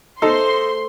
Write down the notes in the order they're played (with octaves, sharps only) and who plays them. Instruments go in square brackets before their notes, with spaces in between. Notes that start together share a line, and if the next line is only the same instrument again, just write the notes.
[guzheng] A3 [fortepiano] D#4 A4 [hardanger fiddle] C5 [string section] C6